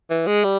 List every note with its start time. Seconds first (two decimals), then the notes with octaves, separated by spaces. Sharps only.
0.10 E3
0.27 G#3
0.44 G3